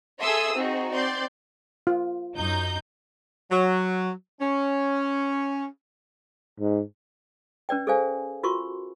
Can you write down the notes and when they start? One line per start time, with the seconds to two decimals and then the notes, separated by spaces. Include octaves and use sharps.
0.21 G#4 A4 E5 C6 D#6 E6
0.55 C4 D#4 F#4 G#4
0.93 C4 D5 C6 G6
1.87 F4
2.35 F#2 D#4 G6
3.51 F#3
4.41 C#4
6.60 G#2
7.69 C#4 B4 D5 G5
7.87 G#4 A4 C5 D5 F5 G#5
8.43 F4 F#4 A#4 C6 C#6